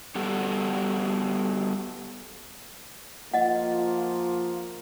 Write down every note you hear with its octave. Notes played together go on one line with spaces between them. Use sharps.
G3 B3 F#4 G4 A4
F3 A#3 F4 D#5 F#5